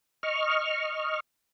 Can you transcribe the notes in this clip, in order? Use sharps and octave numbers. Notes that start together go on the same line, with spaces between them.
D#5 C#6 F6